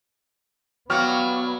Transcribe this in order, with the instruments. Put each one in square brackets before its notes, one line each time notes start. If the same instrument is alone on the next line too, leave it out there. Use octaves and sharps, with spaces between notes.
[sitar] F#3 [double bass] B3 [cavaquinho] G4 D5 F5 [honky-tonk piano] C#6 F6